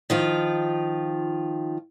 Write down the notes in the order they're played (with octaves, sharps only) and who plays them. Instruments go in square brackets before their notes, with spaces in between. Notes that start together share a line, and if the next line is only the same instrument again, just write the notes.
[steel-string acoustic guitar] D#3 F3 F4